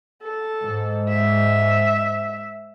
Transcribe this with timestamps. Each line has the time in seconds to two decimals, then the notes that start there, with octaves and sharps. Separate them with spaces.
0.23 A4
0.63 G#2
1.09 E5